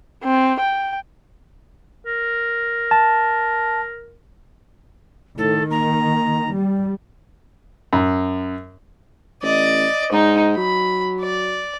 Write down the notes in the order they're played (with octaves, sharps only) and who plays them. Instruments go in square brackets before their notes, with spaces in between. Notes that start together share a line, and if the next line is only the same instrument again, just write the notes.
[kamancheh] C4
G5
[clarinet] A#4
[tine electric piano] A5
[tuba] A2 [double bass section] D#3 [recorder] A4
[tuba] A#3 [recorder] A#5
[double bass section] G3
[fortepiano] F#2
[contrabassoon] A1 [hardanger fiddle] D5 D#5
[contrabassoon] G#2 [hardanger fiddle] D#4
[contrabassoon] F#3 [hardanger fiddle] B5
[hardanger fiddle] D5